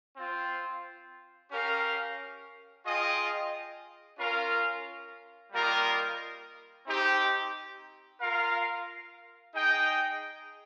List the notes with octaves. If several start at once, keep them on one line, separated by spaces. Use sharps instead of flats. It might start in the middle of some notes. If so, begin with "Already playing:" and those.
C4 F4 C5
C#4 G4 A#4 F5
F4 G#4 D#5 G5
C#4 F4 A#4 F5
G3 A#3 F4 A#4 D#5
C4 D#4 G4
F4 A#4 F5
D#4 G#4 D#5 G5